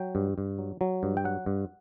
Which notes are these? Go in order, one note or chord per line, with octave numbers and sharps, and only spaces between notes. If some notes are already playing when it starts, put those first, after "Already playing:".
Already playing: F#3 G5
G2
G2
F#3
F#3
G2
G5
F#3 F#5
G2